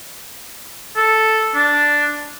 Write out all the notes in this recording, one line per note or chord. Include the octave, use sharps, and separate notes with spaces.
A4
D4